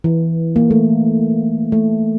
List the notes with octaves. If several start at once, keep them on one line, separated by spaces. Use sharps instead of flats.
E3
A#3
A3
A3